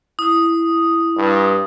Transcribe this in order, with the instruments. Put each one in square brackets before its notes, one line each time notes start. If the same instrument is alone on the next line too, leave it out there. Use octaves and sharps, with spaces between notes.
[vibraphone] E4 [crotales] D#6
[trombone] G2